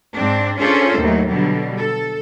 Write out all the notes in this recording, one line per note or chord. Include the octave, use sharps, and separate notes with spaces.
G#2 C4 D4
C#4 D4 F4 G#4 A4 C5
D#2 A2 F#3 D#4
B2 D3 F#3 G3
A4